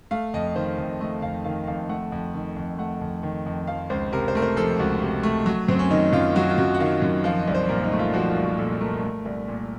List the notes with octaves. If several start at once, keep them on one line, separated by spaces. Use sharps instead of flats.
A3 F5
F2 D#5
D#3 C5
F2
A3 D#5
F2 F5
D#3 F5
F2 F5
A3 F#5
F2
D#3
F2
A3 F#5
F2
D#3
F2
F3 F5
C#2 C5
C3 A#4
C5
A3 A#4
C5
F3 A4
C#2 F#4
C3
A3
F#3
F#2 C4
C#4
D#3 D#4
F#2 F4
F#3 F#4
F4
F#2 F#4
F#5
D#3 F5
F#2
F3 F5
D#5
C2
C5
A#2 A#4
D#4
A3
F4
F3 F#4
F4
C2
F#4
A#2 A4
A3 A#4
A3
C2
A#2